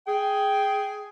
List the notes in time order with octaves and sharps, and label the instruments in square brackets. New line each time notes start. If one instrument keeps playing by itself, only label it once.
[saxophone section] G#4 [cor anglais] G5